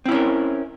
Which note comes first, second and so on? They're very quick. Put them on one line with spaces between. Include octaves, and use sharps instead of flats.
C4 E4 C#4 A#4